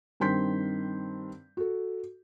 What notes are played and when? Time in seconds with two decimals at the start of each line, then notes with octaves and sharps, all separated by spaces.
0.20 G2 D#3 C4 C6 G6 B6
1.57 F#4 A4